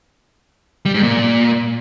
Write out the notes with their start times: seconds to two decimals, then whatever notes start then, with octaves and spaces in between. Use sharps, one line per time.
0.85 G3
0.94 G#2
1.03 A#2